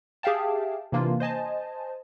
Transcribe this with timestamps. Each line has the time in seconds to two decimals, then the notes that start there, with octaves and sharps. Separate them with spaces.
0.23 G4 G#4 E5 F5 G5 A5
0.92 C3 E3 A#3 D4 F4
1.20 C5 D#5 G#5 A5